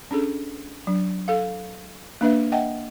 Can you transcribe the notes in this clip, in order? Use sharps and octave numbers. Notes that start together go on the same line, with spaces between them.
C#4 D4 G#4 A4
F#3 D4
A4 F5
A#3 D4 B4 E5
D#5 E5 F#5 G5 A5